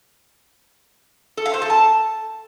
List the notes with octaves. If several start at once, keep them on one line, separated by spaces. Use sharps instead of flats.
A4
F5
C5
A4
A5